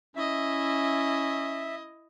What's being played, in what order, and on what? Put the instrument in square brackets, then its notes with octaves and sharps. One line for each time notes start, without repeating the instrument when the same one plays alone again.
[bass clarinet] C#4 [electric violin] E4 D#5 [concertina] E5